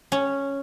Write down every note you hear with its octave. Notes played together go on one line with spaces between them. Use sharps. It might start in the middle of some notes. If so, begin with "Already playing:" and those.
C#4